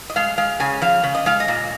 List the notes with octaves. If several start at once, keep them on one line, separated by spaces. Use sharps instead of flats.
D#5
G#3 F5
G#3 F5
C#3 G#5
F3 F5
C#3
D#5
G#3 F5
D#5
A#2